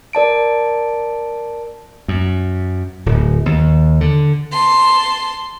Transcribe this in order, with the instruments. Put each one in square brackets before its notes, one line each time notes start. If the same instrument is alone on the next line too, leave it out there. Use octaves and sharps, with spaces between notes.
[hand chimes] A#4 D5 A5 D7
[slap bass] F#2
D1
D#2
D3
[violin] A5 C6